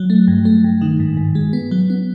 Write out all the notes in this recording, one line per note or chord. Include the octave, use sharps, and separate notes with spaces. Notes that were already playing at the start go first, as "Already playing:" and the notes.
Already playing: F#3
A3
G2
A3
G2
D#3
G#2
G#2
G#3
B3
F#3
B3